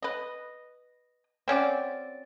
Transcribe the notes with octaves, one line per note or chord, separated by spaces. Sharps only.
B4 D#5
C4 C#4 F#4 D5